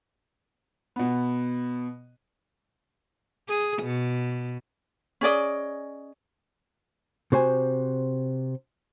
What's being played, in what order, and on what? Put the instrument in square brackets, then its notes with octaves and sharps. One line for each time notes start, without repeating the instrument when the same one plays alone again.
[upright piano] B2 B3
[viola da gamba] G#4
B2
[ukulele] C#4 G#4 D5 D#5
[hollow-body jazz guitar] C3 F#4 C5 G#5